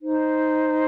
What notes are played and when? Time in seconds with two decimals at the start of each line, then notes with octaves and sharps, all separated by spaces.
0.02 D#4 C5